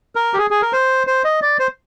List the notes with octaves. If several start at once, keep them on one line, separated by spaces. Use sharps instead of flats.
A#4
G4
G#4
G#4
A#4
C5
C5
D#5
D5
C5